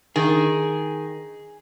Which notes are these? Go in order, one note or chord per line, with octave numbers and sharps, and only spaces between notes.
D#3 G#4